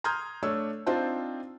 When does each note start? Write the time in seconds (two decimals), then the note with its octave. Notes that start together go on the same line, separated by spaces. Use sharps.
0.04 A#5 C6 D#6 F6 G6 G#6
0.43 A3 D4 C#5 E6
0.86 C4 D4 D#4 F4 C5 A5